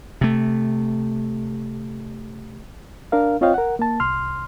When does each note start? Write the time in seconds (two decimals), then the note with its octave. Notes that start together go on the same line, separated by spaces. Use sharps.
0.21 C3 A3
3.12 D4 A#4 F5
3.41 C4 F4 C#5 D#5 F5 G5
3.54 A#4 F#5
3.79 A#3 A5
4.00 C2 C6 F6